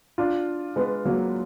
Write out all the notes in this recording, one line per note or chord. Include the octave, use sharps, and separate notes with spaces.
D4 F4
G#3 B3
F#3 A#3